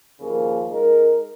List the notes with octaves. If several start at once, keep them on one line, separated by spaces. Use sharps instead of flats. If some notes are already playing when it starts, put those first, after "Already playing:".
D#2 C#3 F3 A#3
G#3 D#4 A#4